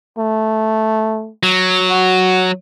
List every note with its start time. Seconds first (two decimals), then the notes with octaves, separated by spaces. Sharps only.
0.18 A3
1.43 F#3
1.90 F#4